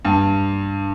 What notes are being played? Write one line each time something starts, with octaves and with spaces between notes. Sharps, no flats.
G2